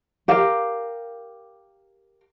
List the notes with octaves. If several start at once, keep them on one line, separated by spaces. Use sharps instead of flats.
G4 A#4 F5